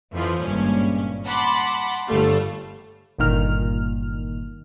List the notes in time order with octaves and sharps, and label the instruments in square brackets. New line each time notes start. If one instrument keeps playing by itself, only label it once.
[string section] F2 E3 F3
G#1 G2 A#2 C#4
F#5 A5 B5 C6 D6
G1 G3 A3 A4 F5
[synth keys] G1 A#2 D#3 F6